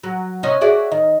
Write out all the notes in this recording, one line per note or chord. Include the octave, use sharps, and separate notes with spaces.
F#3
C3 C#4 D#5
F#4 G#4 D5 E5
D#3 D#5